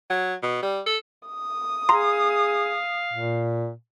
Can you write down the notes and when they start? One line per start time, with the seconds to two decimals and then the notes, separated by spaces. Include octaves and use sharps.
0.10 F#3
0.43 B2
0.62 G3
0.86 A4
1.28 D#6
1.89 G#4 F5 A#5 C6
3.13 A#2